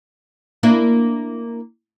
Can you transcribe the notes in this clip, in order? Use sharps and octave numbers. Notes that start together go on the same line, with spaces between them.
A#3 D4 E4